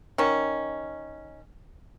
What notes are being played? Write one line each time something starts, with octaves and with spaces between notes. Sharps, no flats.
D#3 C#4